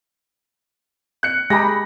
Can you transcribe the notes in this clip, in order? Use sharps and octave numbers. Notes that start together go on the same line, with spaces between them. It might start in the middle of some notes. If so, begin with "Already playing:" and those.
F#6 C#7
G#3 G4 G#4 A#5 B5 A#6